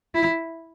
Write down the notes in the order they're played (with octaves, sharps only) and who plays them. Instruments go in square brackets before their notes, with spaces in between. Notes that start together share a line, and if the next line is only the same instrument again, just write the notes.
[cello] E4